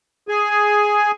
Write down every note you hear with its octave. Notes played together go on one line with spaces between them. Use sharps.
G#4 G#5